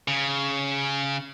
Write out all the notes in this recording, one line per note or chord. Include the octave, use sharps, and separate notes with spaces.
C#3